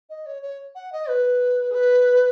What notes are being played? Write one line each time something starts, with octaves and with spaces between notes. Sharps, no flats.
D#5
C#5
C#5
F#5
D#5
B4
G#4
B4